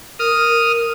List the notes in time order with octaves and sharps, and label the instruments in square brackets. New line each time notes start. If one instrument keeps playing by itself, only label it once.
[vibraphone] A#4 [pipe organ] D#6 F6